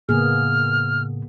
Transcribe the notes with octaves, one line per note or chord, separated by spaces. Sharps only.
A2 C#3 A#3 B3 G#4 F6